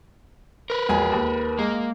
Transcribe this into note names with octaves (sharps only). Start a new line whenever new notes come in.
A#4 B4
E1 A#1 G#5
D#2
G#3 A#3